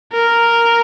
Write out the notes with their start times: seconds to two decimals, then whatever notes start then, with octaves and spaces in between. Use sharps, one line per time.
0.13 A#4